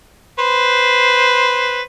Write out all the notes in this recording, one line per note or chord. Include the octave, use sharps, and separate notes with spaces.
B4 C5